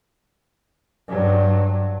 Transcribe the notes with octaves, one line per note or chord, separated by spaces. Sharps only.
G2 F#3